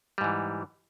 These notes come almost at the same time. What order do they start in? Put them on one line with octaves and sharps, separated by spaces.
G3 G#2 E3